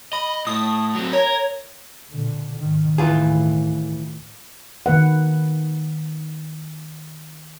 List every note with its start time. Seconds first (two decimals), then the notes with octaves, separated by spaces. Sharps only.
0.13 D#5 B5
0.47 A2 D#6
0.95 F#3 C4
1.13 A#4 C#5
2.11 A#2 D3
2.59 G#2 D#3
2.98 D#2 A2 E3 F4 G#4
4.86 D#3 A#3 B4 F#5